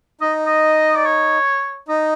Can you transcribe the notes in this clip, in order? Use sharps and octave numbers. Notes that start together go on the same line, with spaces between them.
D#4 D#5
D#5
D5
C#5
D#4 D#5